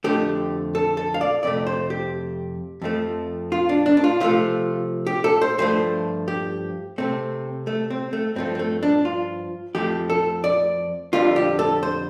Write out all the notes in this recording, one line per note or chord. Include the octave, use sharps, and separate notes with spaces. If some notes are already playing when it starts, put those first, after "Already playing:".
F2 D3 A3 G4
A4
A4
F5
D5
F2 C3 A3 D5
C5
G4
F2 F3 A3
F4
D4
D4
D4
F4
C3 F3 A3 F4
G4
A4
C5
G2 F3 A3 C5
G4
C3 A3 C4
A3
C4
A3
G2 F3 A3 C4
C4
A3
D4
F4
F2 F3 A3 G4
A4
D5
F2 D3 G3 F4
G4
A4
C5